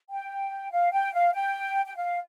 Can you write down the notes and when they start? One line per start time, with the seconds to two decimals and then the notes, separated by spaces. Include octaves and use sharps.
0.10 G5
0.72 F5
0.92 G5
1.13 F5
1.34 G5
1.86 G5
1.96 F5